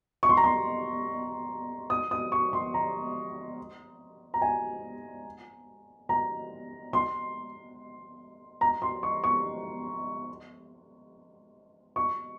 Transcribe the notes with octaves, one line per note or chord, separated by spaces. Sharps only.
C#6
C6
A#5
C6
D#6
D#6
C#6
C6
A#5
A#5
G#5
A#5
C6
A#5
C6
C#6
C#6
C#6